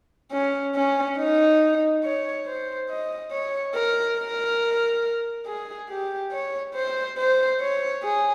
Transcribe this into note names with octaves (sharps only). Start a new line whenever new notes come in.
C#4
C#4
D#4
C#5
C5
D#5
C#5
A#4
A#4
G#4
G4
C#5
C5
C5
C#5
G#4